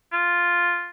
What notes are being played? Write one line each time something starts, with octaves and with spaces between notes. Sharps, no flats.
F4